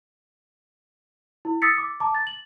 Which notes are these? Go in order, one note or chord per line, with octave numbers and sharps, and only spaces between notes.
E4
D#6 E6 A6 B6 C#7
D6
A5 A#5 D6
A6
F#7